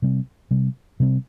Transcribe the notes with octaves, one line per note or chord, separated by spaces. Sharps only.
C3 G3 C4
C3 G3 C4
C3 G3 C4